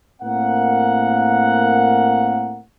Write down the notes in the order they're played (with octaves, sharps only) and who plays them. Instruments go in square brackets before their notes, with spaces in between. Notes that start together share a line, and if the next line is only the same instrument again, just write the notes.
[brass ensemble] A2 A#3 C4 A#4 F#5